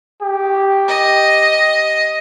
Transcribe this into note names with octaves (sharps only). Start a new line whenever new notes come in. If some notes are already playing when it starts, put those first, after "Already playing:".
G4
D#5